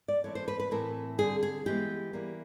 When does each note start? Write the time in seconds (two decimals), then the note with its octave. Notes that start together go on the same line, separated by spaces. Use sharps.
0.08 D5
0.24 E3 A3 C4 C#5
0.35 C5
0.48 B4
0.60 B4
0.71 A2 E3 A3 C4 A#4
1.18 D3 G3 C4 G#4
1.43 G#4
1.66 E3 G#3 B3 G4
2.13 E3 G3 A#3